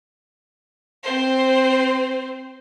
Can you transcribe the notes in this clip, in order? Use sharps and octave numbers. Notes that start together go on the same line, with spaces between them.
C4 C5